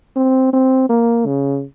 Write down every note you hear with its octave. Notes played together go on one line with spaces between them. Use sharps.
C4
C4
A#3
C#3